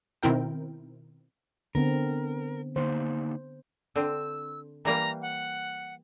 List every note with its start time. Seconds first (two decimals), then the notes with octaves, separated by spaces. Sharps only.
0.23 B2 D#3 C4 E4 A#4 G5
1.75 D3 B3 C4 A#4
2.76 D3 A#3 D#4 C5
3.96 D3 C4 E6
4.85 E3 G3 A#3 A#5
5.22 F#5